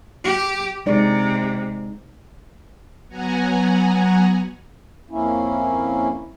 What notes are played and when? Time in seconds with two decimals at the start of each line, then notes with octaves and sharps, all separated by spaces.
0.24 G4
0.86 C3 G#3 D#4 D5
3.09 F#3 B3 F#5 G#5 A#5
5.10 F2 A#3 C#4 E4